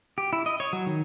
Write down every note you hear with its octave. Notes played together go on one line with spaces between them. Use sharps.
G4
E4
D#5
C#5
F#3
D#3